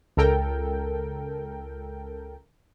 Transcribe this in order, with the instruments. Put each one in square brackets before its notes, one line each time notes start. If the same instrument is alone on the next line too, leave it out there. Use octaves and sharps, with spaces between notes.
[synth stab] C#2 A4 A#4 G5